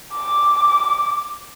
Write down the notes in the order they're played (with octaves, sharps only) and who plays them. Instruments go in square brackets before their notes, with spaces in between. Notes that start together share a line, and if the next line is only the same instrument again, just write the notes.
[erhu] D6